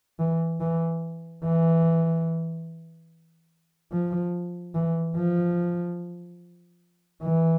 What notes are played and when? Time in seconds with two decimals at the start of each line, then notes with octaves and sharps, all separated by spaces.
0.19 E3
0.60 E3
1.44 E3
3.92 F3
4.74 E3
5.16 F3
7.23 E3